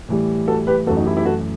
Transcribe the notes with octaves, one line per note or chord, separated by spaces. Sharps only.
A2 E3 G3
F#4 A4
G4 B4
F#2 E3 A3 F#4 A4
D#4 F#4
E4 G4
E4 G4
F#4 A4